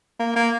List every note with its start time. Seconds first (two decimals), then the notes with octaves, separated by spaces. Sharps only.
0.20 A#3
0.36 A#3